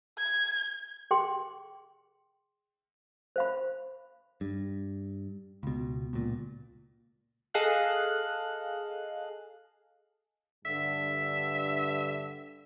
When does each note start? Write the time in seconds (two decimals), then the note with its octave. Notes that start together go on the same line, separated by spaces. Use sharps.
0.19 G#6
1.11 G#4 G5 C6
3.36 C5 F5 B5
4.41 G2
5.63 C#2 B2
6.13 C#2 A#2
7.54 G#4 A4 D#5 F5 F#6
10.65 G2 D3 E5